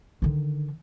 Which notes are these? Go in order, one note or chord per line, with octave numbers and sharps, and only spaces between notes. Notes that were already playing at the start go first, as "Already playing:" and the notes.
D3 D#3